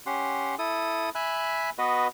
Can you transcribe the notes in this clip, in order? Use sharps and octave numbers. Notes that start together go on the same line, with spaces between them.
C#4 G4 F#5 C6
E4 A4 D#6
E5 G#5 B5 F#6
B3 F#4 B4 D#5